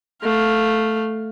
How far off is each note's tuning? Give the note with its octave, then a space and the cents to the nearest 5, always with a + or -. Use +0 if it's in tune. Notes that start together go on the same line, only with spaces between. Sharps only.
A3 +0 F5 +0